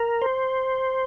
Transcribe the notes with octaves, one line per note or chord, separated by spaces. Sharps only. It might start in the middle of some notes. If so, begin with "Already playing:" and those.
Already playing: A#4
C5